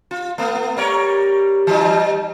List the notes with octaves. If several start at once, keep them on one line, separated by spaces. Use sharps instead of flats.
F4
A3 B3
G3 A#4 C#5
E3 G3 D#4